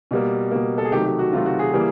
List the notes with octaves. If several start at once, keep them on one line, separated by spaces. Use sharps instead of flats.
B2 G3 A#3
B2 G3 A#3
A4
G#4
C3 D#3 F#3 A3 G4
G4
F#4
C3 D#3 F#3 A3 F4
F#4
G#4
E3 G3 A#3 G#4